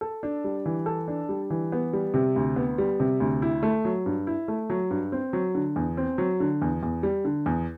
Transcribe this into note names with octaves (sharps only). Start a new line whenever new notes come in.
A4
D4
G3
E3
A4
D4
G3
E3
B3
G3
C3
D2
B3
G3
C3
D2
E4
A3
F#3
G2
E4
A3
F#3
G2
C4
F#3
D3
E2
C4
F#3
D3
E2
E2
G3
D3
E2